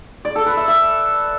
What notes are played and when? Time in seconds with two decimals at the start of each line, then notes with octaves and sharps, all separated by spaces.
0.25 D5
0.36 A4
0.46 B4
0.57 E5
0.68 E5